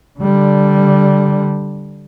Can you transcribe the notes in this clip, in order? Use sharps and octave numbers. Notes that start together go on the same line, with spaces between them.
D3 G3